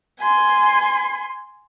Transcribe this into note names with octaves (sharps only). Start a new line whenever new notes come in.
G#5 C6